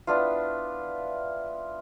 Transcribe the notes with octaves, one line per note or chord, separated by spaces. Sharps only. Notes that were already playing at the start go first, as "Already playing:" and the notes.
B3 D4 E4 F4